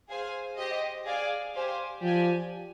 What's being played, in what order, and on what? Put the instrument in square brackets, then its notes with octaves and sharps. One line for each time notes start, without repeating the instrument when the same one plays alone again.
[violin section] G#4 C5 F5 G#5
G4 C5 D#5
G#4 D5 F5 G#5
G4 C5 F5 G#5
[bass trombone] F3 [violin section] G4 D5 G#5